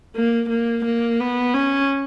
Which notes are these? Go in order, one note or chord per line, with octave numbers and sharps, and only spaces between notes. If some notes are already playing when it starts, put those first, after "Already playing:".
A#3
A#3
A#3
B3
C#4